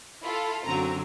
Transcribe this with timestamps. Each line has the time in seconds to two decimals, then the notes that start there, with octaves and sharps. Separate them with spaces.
0.22 E4 F4 A4
0.65 F#2 D3 F#3 C4 A#5